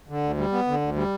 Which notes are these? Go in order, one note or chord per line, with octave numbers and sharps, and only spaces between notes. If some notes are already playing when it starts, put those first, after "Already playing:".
D3
D2
G3
B3
D3
D2
G3